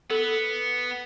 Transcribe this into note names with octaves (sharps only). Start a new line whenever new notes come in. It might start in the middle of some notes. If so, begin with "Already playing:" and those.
B3 A4